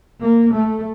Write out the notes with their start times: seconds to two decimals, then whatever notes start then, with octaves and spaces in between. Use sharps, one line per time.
0.22 A#3
0.53 A3